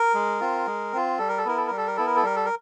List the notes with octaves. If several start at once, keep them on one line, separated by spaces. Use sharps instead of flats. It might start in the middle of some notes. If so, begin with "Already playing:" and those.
Already playing: A#4
G#3
C4 F4
G#3
C4 F4
G3 A4
A#4
A4
B3 E4 A#4
A4
G3 A#4
A4
A#4
B3 E4 A4
A#4
A4
G3 A#4
A4
A#4